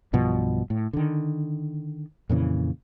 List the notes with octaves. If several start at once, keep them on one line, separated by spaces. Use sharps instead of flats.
B1 G2 B2 F3
A2
D3 D#3
F2 A#2 C#3 E3